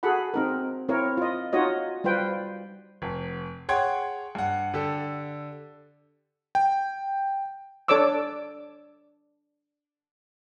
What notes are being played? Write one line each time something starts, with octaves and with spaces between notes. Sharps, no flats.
F#4 G#4 A4 F#5 B5
C4 D#4 A#4
C4 E4 A#4 C#5
F4 D#5
D#4 F4 F#4 C#5 D#5
G3 F4 B4 C5 G5
F1
G#4 C#5 F#5 G5 C6 G#6
G2 F#5
D3 G4 A4
G5
D4 A4 C#5 D5 D6 E6